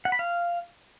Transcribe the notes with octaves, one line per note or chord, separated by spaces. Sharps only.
F#5
B5
F5